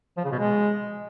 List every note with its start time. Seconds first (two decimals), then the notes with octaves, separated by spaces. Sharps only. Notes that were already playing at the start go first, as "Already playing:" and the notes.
0.17 F3
0.24 C#3
0.32 B2
0.39 G#3